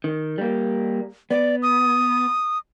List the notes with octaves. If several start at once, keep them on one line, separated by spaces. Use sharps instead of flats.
D#3
G3 A#3
B3 D5
D#6